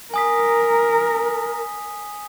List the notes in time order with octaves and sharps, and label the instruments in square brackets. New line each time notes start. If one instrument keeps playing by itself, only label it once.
[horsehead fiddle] A#4 [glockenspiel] G#5 D#6 B6